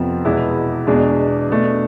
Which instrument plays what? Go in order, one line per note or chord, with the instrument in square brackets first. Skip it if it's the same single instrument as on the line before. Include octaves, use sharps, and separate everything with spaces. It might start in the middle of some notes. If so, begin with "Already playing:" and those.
Already playing: [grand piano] F2 C3 F3 B3
E2 B2 G#3 B3 E4
E2 B2 G#3 D4
B2 A3 D4